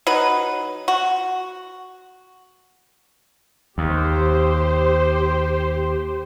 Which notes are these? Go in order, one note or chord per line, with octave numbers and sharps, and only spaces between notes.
F#3 D#4 B4
F#4
D#2 G4 C5